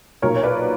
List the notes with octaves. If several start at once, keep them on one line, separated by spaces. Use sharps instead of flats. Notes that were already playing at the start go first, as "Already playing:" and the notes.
B1 A#2 F#3 A#4 C#5
C#5
B4 D5